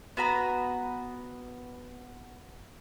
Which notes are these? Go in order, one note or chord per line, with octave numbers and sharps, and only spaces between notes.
B3 F#4 A#5 B5